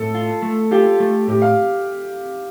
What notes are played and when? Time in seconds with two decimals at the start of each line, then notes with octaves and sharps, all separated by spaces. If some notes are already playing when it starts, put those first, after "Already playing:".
Already playing: A2 A4
0.15 F4
0.42 A3
0.71 F4 G4
1.00 A3
1.28 A2 G4
1.42 F5